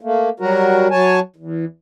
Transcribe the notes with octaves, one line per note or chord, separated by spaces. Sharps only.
A3 A#3
F#3 G3 F#4 A#4
F#3 C#5 G#5 A5
E2